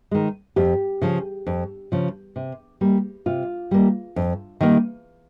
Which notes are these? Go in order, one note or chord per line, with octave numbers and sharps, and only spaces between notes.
D#3 G#3
F2 G4
C#3 F3
F2
C#3 F3
C3
G3 A#3
C3 F4
G3 A#3
F2
D#3 G3 A#3